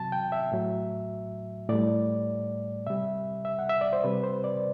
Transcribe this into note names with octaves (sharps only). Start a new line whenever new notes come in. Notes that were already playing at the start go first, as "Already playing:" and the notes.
Already playing: C3 F#3 A5
G5
E5
A2 F#3
A2 G3 D5
C3 G3 E5
E5
F#5
E5
D5
C5
C3 G3 B4
C5
D5